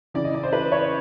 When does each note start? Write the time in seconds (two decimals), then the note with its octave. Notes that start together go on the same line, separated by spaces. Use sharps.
0.14 C#3 E3 D5
0.24 D#5
0.34 D5
0.43 C5
0.53 B4
0.72 C#5